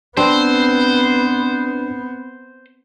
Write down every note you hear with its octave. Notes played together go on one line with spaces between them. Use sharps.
B3 C4 D4 B4 C5